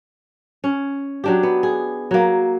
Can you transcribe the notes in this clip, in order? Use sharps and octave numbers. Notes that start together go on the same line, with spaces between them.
C#4
F#3 D4 G4
B3
G#4
F#3 A#3